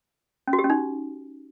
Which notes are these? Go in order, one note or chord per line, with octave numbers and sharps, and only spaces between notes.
C#4
F#4
G4
C#4
D#4